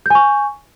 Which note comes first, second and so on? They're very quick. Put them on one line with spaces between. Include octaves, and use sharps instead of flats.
G6 G#5 C#6